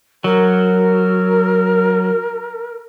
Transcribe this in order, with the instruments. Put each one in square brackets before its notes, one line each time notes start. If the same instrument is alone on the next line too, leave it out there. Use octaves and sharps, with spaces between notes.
[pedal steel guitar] F#3 [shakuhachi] A#4